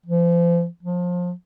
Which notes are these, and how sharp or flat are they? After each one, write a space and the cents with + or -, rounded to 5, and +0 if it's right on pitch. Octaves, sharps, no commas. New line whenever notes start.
F3 -35
F3 +25